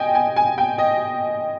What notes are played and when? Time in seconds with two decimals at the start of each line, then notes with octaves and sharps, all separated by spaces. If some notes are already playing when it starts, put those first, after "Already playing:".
Already playing: D#5 G5 G#5
0.15 G#5
0.36 G#5
0.58 G5
0.78 D#5